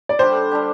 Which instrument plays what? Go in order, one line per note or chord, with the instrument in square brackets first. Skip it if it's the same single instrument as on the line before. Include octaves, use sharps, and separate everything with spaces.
[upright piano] D5
[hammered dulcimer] D3 G3 D4 G4 [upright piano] C5
[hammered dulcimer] D3 G3 D4 G4